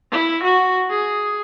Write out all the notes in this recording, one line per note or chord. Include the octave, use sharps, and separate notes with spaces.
E4
F#4
G#4